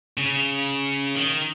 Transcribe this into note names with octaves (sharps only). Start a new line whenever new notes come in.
C#3
D#3